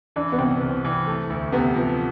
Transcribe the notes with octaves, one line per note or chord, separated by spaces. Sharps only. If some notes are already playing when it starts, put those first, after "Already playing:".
E3 D4
B3
C2 C4
C2
E3
A3
D2
C3 B3
F3